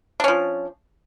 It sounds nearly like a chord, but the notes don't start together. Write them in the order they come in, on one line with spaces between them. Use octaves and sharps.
D4 C#4 F3